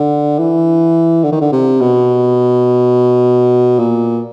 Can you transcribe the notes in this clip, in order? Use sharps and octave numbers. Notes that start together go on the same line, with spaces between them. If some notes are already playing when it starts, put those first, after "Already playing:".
Already playing: D3
E3
D3
D#3
D3
C3
B2
A#2